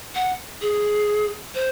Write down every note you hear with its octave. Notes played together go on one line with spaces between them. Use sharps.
F#5
G#4
C5